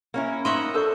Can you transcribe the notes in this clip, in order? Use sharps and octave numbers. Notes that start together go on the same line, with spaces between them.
A#3 C#4 E4
D#4 D#5 E5 F#5 C6 C#6
D4 A4 A#4 C5 C#6